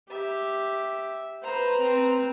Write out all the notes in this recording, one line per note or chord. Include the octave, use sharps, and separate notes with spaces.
G4 E5
B4 C5 A#5
C4